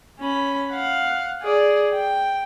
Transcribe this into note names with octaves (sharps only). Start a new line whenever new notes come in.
C#4 B5
F5 F#5
G#4 D5
G5